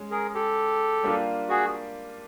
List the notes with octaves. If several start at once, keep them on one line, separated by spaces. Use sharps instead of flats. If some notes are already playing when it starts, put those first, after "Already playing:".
Already playing: G#3 C#4
G#4 A#4
G4 A4
G3 A#3 D4 F4
F#4 G#4